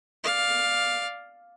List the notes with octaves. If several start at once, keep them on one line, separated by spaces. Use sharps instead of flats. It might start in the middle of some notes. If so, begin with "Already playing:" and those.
D5 F5